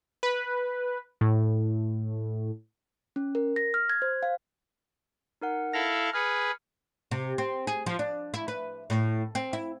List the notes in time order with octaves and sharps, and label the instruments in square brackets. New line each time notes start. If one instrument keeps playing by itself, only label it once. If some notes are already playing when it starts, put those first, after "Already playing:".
[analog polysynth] B4
A2
[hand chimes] C#4
A#4
A#6
F6
G#6
C5
F5
[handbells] D#4 A#4 F#5
[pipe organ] E4 A4 F5 [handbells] A#6
[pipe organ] G#4 B4 [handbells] F6 C#7
[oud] C3
C4
G#4
F3
D4
E4
B4
A2
C4
E4